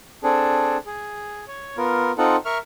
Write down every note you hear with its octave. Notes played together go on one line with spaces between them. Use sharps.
C4 D4 G#4 A4
G#4
C#5
B3 F4 A#4
C4 D#4 F4 A4 F#5
A#4 E5 C#6 F6